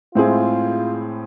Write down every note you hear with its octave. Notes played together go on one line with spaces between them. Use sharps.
A2 G#3 C4 E4 F4 G#4